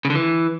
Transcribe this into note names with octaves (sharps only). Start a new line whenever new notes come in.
C#3
D3
E3